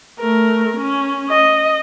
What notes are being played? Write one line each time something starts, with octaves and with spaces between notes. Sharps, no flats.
A3 A#4
C#4
D#5